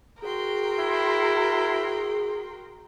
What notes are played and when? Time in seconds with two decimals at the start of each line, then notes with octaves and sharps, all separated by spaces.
0.22 F#4 G#4 A#4 G5 C6
0.79 E4